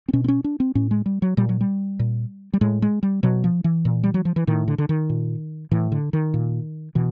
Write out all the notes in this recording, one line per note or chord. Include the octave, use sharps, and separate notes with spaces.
C4
B2 C#4
C4
C#4
D4
C4
A2 C#4
G#3
G3
F#3
A#2 G3
F#3
G3
A#2
G3
A2 G#3
G#3
G3
B2 F#3
F3
E3
A#2
G3
F#3
F3
E3
A2 D#3
D3
D3
D#3
A#2
A2 E3
D3
D#3
A#2
B2 E3